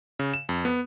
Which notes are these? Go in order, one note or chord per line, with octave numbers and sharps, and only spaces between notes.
C#3
E7
F2
B3